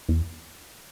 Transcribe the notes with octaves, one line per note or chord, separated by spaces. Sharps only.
E2